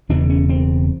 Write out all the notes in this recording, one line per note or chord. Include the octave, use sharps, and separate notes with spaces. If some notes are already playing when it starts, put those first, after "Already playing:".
E1 E2 C#3 D4
C#4
C4